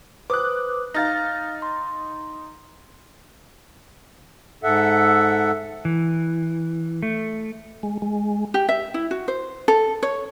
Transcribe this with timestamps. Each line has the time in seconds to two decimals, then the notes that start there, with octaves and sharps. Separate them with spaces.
0.30 B4 C5 D6 D#6 F#6
0.94 D#4 F5 F6 A6 A#6
1.62 C6
4.63 G#2 A4 E5 F#5
5.85 E3
7.03 A3
7.83 G#3
8.02 G#3
8.54 G4
8.69 E5
8.94 E4
9.11 F#4
9.28 C5
9.68 A4
10.03 C#5